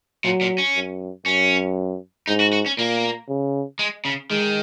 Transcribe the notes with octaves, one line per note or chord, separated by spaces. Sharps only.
A#2 F#3
A#2
C#4
F#2
F#2 C#4
G#2 D#4
F#4
F#4
C#4
A#2 A#3
C#3
G#3
C#3
D#3 G#3